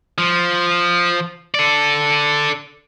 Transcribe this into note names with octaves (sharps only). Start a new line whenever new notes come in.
F3
A4 D5